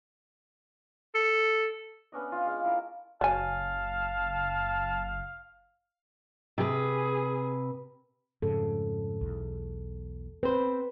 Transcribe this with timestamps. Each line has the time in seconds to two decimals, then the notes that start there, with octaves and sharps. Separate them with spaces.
1.15 A4
2.12 B3 C#4 D4 D#5
2.32 F4
2.45 G#3 F5
2.64 E4 A4 A#4
3.21 F#1 F#3 F5 G#5 A5
6.58 C3 G#4 B4
8.42 F2 G#2 C#3 A4
9.21 B1 E2
10.43 C4 B4 C5